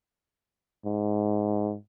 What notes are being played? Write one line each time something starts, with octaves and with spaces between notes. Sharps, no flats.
G#2